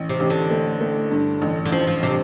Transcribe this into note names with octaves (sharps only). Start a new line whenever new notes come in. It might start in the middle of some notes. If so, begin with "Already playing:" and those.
Already playing: A1
C3
A1
D3
A3
A3
G2
A1
D3
A1 F3
F3
C3